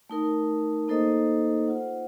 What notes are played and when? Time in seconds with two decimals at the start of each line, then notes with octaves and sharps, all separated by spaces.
0.10 A3 D#4 A#4
0.88 A#3 D#4 A4 C5 D#5
1.68 F4 C5 F#5